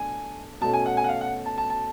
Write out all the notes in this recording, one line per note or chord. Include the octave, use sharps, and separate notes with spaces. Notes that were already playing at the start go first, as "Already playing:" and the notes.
Already playing: B2 A3 D4 G#5
B2 A3 C#4 A5
G#5
F#5
G#5
F#5
F5
F#5
A5
A5
A5